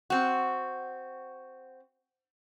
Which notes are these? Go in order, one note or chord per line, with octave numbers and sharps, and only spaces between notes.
C4 F#4